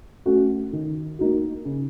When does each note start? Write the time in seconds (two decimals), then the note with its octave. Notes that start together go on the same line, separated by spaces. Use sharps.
0.25 A3 C#4 F#4
0.73 D#3
1.19 A#3 D#4 F#4
1.65 C#3